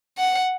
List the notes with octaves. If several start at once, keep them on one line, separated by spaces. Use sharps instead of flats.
F#5